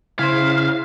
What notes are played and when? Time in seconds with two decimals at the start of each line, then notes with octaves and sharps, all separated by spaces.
0.19 C#3 E4 C5 F5